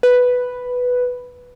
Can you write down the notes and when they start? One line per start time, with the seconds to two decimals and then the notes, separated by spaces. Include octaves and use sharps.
0.03 B4